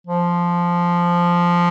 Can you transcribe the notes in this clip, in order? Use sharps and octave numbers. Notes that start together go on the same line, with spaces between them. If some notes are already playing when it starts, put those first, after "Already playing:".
F3